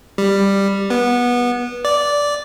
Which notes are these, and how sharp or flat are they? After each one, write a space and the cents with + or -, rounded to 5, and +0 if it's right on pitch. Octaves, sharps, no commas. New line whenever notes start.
G3 +10
B3 -20
D5 -10